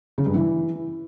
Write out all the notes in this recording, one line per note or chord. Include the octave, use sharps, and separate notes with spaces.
C#3
G2
E3